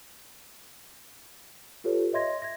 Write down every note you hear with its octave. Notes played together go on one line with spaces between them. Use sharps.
F4 G4 A4 B4 C#5
C#5 D#5 E5 C6 G#6 A#6
G#6 A#6